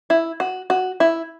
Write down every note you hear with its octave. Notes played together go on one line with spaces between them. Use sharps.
E4
F#4
F#4
E4